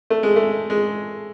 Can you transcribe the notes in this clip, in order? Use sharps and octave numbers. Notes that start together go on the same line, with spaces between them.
A3
G#3
A3
G#3